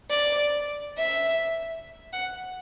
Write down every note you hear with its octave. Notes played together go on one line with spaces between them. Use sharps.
D5
E5
F#5